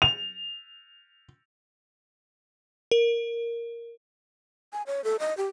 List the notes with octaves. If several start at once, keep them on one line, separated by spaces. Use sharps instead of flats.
F7
A#4
G#5
C#5
A4
D#5
G4